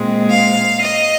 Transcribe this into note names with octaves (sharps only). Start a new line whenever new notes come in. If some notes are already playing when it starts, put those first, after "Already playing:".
Already playing: A#2 G#3 C4
F5
D#5